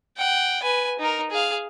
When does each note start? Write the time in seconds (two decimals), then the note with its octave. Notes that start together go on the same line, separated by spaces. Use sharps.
0.18 F#5 G5
0.63 B4 G#5
1.00 D#4 A#4
1.31 G#4 F5